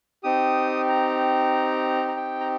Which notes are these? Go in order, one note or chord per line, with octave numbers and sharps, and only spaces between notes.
C4 D#4 G4 D#6
A#5
A#5
G5
A#5